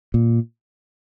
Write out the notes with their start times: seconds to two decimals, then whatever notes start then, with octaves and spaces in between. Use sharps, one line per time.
0.14 A#2